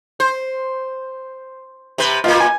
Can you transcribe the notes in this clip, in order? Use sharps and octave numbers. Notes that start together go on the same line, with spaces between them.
C5
C3 B4
A#2 A#3 F4
G#5